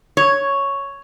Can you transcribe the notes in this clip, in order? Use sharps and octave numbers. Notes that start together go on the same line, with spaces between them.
C#5